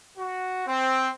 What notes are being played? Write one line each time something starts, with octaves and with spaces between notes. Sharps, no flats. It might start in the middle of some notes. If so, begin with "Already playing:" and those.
F#4
C4